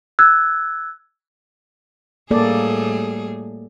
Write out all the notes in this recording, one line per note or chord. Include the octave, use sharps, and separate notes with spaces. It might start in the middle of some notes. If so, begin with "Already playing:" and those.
E6 F#6 G#6
A2 G3 A#3 G#4 A4 D5